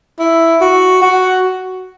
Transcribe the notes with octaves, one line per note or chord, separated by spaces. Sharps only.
E4
F#4
F#4